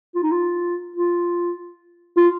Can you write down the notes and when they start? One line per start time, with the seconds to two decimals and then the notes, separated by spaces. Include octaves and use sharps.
0.15 F4
0.23 D#4
0.31 F4
0.96 F4
2.17 F4